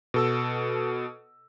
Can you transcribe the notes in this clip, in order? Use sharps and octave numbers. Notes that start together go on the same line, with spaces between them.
B2 A4 E6